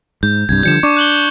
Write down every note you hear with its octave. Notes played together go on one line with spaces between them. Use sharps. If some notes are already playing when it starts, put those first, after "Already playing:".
G#2 G6
C2 G2 G#6
D3 F3 G3 G6 C#7 E7
D4 C#6 D6 C#7
F#6 F#7 G7